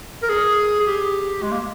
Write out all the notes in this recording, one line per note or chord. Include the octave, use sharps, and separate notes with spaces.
A#4
G#4
G#4
G4
G#3
A#3